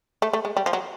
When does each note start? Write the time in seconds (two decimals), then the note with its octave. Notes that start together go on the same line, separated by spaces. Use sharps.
0.22 A3
0.33 A3
0.45 G#3
0.57 G3
0.66 F3
0.73 F#3